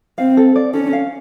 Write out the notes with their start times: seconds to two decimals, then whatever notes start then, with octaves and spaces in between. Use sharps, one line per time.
0.18 C4 F5
0.37 A4
0.56 D5
0.73 C#4 A4
0.93 F5